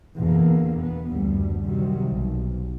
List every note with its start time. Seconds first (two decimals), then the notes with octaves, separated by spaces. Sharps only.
0.17 E2 B2 D3 E3 A#3
0.78 B3
1.09 F#1 D2 D3 G3
1.64 C3 D#3 F#3 G3
2.06 B1